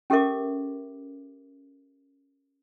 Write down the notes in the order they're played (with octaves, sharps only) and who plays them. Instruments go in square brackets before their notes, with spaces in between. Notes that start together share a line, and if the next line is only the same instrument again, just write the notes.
[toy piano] C#4 G4 A4 A#4 E5 D6